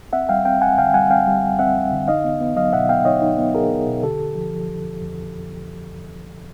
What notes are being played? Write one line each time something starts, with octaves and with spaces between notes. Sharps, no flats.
C4 E5 F#5
G3 F5 G5
C4 F5 G5
F2 F#5 G#5
D3 F5 G5
G3 F#5 G#5
C4 F5 G5
G3
F2
C4 E5 F#5
F2
D3
D#4 D#5 F5
B3
B3
F#3 D#5 F5
B2 E5 F#5
B3 F5 G5
D#4 C#5 D#5
D#4
B3
B2 G#4 A#4
B3
B2
D3 G4 A4
F2
F3
F3
F2
F2
F2